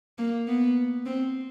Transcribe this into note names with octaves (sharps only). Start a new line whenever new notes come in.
A#3
B3
C4